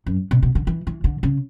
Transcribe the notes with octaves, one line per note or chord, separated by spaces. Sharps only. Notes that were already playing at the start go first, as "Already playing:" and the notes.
F#2
B2
B2
D3
E3
E3
D3
C#3